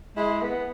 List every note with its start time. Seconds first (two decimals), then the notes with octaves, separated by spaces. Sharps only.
0.17 G#3 E4
0.42 B3